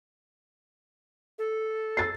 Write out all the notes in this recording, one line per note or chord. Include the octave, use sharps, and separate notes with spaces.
A4
E6 A6 C7